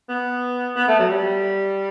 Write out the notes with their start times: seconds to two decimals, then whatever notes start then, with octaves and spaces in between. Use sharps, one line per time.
0.09 B3
0.76 B3
0.88 A3
1.00 F#3
1.09 G3